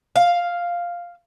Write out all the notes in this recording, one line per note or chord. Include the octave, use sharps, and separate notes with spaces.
F5